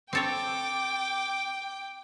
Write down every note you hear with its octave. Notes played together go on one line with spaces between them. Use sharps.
C4 A4 C#5 G5 D6